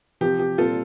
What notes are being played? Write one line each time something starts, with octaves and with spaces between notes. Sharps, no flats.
C3 F3 C4 G4
G4
A#2 G3 C4 F4 A4